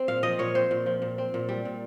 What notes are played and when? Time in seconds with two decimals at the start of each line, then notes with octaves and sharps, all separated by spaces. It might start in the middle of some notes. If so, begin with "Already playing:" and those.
Already playing: C4
0.08 A#2 F5
0.23 F3 D#5
0.39 A#2 C#5
0.55 C4 C5
0.71 A#2
0.86 F3
1.02 A#2
1.18 C4
1.34 A#2
1.49 G3
1.65 A#2